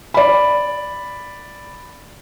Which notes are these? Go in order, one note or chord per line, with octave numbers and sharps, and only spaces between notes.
D5 B5